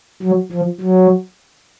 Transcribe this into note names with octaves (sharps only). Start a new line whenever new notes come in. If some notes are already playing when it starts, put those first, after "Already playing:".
F#3
F3
F#3